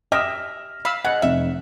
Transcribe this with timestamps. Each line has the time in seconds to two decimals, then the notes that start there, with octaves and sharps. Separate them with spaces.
0.12 G4 D#5 E5 F6 A#6 E7
0.85 F5 B5 E6
1.05 C#3 D#5 F#5
1.22 F1 E5